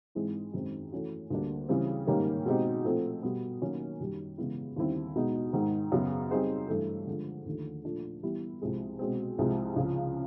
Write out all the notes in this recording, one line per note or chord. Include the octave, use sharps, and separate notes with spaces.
G#2 E3 G#3 C4 E4
F#2 D#3 G#3 C4
E3 A3 C#4 F#4
D2 D3 G3 A#3 D4
C#3 E3 G3 C4
G#2 D#3 G3 A#3 C#4
B2 G#3 C4 D#4 G4
A#2 F3 A3 C4
B2 G3 B3
D#3 F#3 A#3 C#4 F#4
F#2 D#3 G3
C#3 E3 G#3 B3 E4
D#2 D3 G3 C4 E4
B2 G#3 B3 D#4
G#2 D#3 G#3
F#2 C#3 F#3 B3
G3 C4 D#4 G#4 C5
G2 E3 A3
D3 F3 G#3
D#2 D3 F3 A3
A#2 F3 A3 D4
E3 G3 B3 E4 G4
C2 C3 F3 G#3
B2 G#3 C4
C2 C3 F3 G#3
C#2 C#3 F3